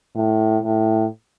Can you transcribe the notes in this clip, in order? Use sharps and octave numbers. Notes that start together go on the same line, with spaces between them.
A2
A2